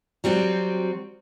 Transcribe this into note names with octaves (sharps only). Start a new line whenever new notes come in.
F#3 G3 C4 F#4